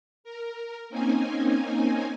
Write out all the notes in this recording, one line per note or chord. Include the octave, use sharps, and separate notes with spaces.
A#4
A#3 C4 C#4 D#4 G#5